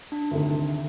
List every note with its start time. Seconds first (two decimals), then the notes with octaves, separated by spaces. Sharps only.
0.12 D4
0.31 D2 C3 D#3